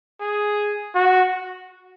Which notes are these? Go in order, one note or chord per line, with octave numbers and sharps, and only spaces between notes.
G#4
F#4